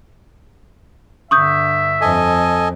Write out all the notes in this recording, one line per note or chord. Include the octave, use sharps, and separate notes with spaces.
G2 D3 E5 C#6 D#6 G6
F2 A4 D#5 G#5